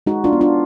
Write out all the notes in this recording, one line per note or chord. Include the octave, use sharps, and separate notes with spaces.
G#3 D#4 F#4
D4 F4
B3
D4 F4